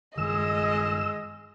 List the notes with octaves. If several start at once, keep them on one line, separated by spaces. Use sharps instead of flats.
G2 D#3 G#3 D#5 E6